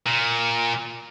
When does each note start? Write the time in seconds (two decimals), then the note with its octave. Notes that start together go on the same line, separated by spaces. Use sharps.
0.06 A#2